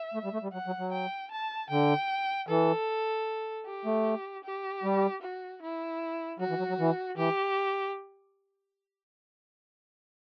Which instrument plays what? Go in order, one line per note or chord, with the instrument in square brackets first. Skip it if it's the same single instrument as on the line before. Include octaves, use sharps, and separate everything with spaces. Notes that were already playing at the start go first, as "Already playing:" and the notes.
Already playing: [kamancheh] E5
[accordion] A3
G3
A3
G3
[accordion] F#3 [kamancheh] F#5
[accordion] F#3
F#3
[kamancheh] G5
A5
[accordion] D3 [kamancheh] G5
[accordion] E3 [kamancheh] A4
[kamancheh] G4
[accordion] A3
[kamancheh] G4
[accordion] G3
[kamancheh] F#4
E4
[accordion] F#3 [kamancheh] F#4
[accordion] E3
F#3
F#3
E3
[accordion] E3 [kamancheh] G4